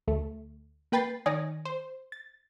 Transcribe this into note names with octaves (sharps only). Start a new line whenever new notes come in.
D2 A3
A#3 B4 G5 B5 A6 C7
D#3 C#5 D5 G#5 D#6 A#6
C5
A6